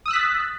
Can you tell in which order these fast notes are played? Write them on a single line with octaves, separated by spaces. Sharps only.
D#6 E6 F#6 B6 A6